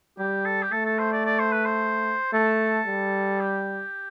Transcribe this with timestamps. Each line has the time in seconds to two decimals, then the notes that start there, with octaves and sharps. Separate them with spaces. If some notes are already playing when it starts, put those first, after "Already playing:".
0.18 G3 G4
0.45 A4
0.62 G4
0.72 A3 A4
0.85 A4
0.99 C5
1.12 D5
1.25 D5
1.39 C5
1.52 B4
1.65 C5
2.33 A3 A4
2.87 G3
3.40 G4